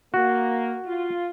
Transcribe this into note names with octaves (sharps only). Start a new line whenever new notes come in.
A#3 F#4
F4